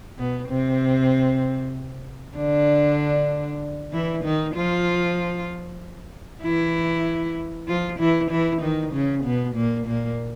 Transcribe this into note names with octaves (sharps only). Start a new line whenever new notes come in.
B2 B3
C3 C4
D3 D4
E3 E4
D#3 D#4
F3 F4
E3 E4
F3 F4
E3 E4
E3 E4
D#3 D#4
C#3 C#4
B2 B3
A#2 A#3
A#2 A#3